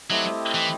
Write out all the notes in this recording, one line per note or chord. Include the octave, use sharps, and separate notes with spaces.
F#3 A3 C4 E4 G4 D#5
E3